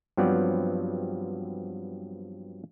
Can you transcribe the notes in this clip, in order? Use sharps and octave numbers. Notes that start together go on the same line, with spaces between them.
G2 F3 F#3 B3 C4 D5